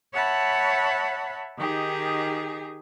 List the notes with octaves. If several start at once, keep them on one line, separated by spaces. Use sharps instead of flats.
C#5 E5 F#5 A5 B5
D#3 D#4 G4 G#4